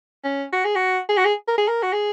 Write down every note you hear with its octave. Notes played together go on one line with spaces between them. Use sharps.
C#4
F#4
G#4
F#4
G#4
F#4
G#4
A#4
G#4
A#4
F#4
G#4